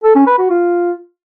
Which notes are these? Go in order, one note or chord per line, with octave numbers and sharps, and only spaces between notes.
A4
C#4
B4
F#4
F4